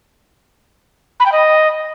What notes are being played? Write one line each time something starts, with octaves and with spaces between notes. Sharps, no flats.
B5
G5
D#5